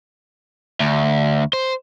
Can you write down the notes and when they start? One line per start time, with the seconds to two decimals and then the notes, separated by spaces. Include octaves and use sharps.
0.80 D2
1.53 C5